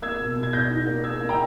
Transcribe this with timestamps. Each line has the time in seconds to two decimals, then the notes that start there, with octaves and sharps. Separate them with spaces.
0.02 A#3 E6 G#6
0.19 B2
0.36 B2
0.43 G#6
0.53 B2 G6 A#6
0.70 D#4
0.87 A#3
1.04 A#3 E6 G#6
1.21 A#3
1.29 G5 A#5